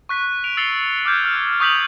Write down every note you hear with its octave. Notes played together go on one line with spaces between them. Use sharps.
C#6 F#6 B6
D7 F7
E6 A6 C7 C#7 F7 G7
D6 F6 G6 G#6
F6
C#6 D#6 G6 B6 F7 F#7